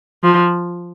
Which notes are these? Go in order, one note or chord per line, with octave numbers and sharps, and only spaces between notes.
F3